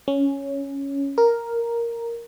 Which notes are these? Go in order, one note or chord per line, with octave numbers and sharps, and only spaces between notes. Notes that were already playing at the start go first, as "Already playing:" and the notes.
C#4
A#4